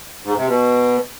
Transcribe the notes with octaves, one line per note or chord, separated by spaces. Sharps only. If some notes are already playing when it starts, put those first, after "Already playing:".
G#2
C3
B2